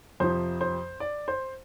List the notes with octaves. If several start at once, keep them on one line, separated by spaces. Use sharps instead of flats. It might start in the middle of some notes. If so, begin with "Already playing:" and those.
F2 C3 F3 C5
C5
D5
C5